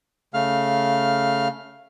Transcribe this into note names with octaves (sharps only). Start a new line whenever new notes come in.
C#3 A3 F5 F6